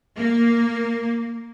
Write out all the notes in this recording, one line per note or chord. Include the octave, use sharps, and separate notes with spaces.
A#3